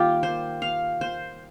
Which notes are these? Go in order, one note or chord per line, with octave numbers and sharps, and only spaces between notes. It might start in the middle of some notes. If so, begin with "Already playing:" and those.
Already playing: D#3 G3 A#3 F4 G4
C5
F5
C5